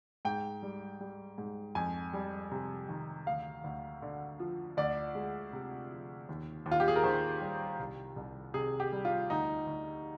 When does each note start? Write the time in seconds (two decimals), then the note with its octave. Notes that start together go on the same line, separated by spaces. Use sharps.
0.25 G#2 G5
0.63 G3
1.00 G3
1.38 G#2
1.75 F2 G#5
2.13 G3
2.51 C3
2.89 D#3
3.26 D2 F5
3.64 D2
4.02 D3
4.40 F3
4.77 D2 D5
5.15 G#3
5.53 C3
5.91 F3
6.29 D#2
6.66 D#2
6.71 F4
6.80 G4
6.88 G#4
6.96 A#4
7.03 D#3 C5
7.41 G3
7.79 C2
8.16 C2
8.54 C3 G#4
8.80 G4
8.92 G3
9.05 F4
9.30 D2 D#4
9.67 D2